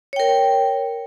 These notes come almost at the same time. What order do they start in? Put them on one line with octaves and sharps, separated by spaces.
C#5 G5 A#4